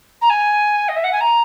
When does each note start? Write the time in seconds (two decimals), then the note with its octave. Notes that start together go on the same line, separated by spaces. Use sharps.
0.21 A#5
0.29 G#5
0.88 D#5
0.96 E5
1.04 F#5
1.12 G#5
1.20 A#5